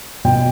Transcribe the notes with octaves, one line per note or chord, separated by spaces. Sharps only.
B2 G5